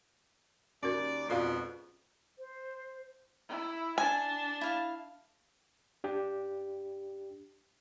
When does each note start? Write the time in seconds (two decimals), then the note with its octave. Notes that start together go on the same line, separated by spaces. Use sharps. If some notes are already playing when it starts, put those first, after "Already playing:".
0.83 D#2 C#4 F#4 A#4 D5
1.29 F2 G#2 B2 F4 D5 F5
2.39 C5
3.49 E4
3.98 D4 G#5 A5
4.61 E4 F5
6.04 D4 G4